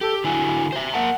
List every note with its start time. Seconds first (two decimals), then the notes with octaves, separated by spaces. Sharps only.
0.01 G4 A4
0.24 D3 E4 F#4 G#5
0.72 C5 E5
0.94 A#3 A#4 F#5 A5